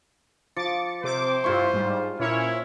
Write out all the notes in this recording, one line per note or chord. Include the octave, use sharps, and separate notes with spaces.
F3 D6 A6 C#7
C3 C5 D6
G2 E4 F4 C#6
G#2 G3
A#2 C#4 E4 C#5